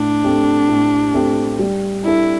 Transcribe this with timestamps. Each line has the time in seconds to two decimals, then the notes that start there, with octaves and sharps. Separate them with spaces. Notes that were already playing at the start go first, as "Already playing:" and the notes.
Already playing: A2 D4
0.24 A3 C4 G4
0.69 A2
1.14 A3 C4 G4
1.59 G3
2.04 D4 E4 A4